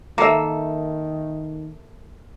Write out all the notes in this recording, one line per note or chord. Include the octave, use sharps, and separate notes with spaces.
D#3 A#3 A4 E5